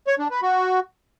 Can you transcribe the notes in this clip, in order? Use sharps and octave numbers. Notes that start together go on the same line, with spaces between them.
C#5
D4
B4
F#4